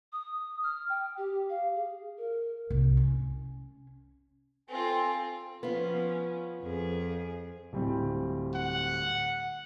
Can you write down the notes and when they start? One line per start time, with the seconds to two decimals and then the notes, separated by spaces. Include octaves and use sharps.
0.13 D#6
0.64 F6
0.89 G5
1.18 G4
1.50 F5
1.76 G#4
2.18 A#4
2.70 C2
2.97 C#4
4.69 C4 F4 A4 G#5
5.63 F3 B3 C#4 F4
6.62 F2 G#4
7.73 D1 G3 C4
8.55 F#5